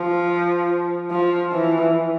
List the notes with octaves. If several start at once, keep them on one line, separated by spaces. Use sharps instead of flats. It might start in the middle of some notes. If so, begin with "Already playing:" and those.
Already playing: F3
F3
E3